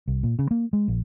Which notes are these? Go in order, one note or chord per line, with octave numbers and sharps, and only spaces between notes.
C2
A#2
C#3
A#3
G#3
A#1